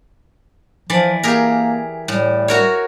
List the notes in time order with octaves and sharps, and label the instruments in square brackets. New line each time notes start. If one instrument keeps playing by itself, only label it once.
[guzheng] E3 D5 [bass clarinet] F3
[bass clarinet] A#3 [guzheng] G4 G#4 A#4
[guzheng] A2 [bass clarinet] G3
[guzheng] F#4 A#4 C#5